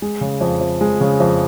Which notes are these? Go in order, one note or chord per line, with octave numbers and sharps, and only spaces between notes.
G#3
C#3
F2
F2
G#3
C#3
F2